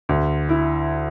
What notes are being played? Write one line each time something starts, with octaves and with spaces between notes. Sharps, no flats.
D2
E4